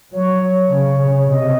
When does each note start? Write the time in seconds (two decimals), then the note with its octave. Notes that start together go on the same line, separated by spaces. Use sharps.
0.12 F#3 C#5
0.71 C#3
1.01 C#3
1.30 C3 D#5